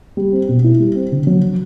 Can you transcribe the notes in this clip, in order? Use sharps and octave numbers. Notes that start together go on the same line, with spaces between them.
G3
C4
B2
E4
G3
C4
D3
F#3